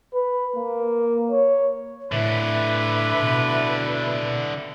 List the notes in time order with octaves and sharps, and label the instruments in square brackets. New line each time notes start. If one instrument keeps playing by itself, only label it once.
[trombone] B4
A#3
C#5
[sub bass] A2 [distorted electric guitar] D3 E4 [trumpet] B4 [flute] E5
[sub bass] B2